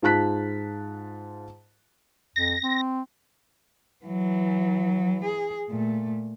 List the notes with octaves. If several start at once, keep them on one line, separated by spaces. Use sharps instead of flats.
G#2 F4 A5 F#6 B6
F2 A#6
C4
E3 F#3
G#4
A#2 A3